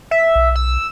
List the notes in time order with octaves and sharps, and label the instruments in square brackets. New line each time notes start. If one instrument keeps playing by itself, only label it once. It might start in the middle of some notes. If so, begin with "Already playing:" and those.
[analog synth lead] E5
[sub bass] B1
[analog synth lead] E6